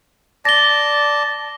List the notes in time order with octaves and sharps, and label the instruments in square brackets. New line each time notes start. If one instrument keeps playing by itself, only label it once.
[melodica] D5 A5 [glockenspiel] A#6 G7